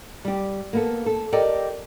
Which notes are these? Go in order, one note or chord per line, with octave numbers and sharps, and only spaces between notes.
G3 G4
A#3 B3 A4
A4
G4 A4 A#4 D5 D#5 G5